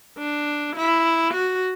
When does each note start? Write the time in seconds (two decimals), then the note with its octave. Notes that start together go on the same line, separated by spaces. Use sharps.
0.18 D4
0.76 E4
1.33 F#4